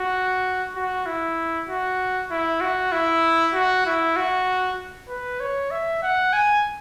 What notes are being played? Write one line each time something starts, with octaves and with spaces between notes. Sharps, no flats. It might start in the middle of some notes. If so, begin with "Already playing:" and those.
Already playing: F#4
F#4
E4
F#4
E4
F#4
E4
F#4
E4
F#4
B4
C#5
E5
F#5
G#5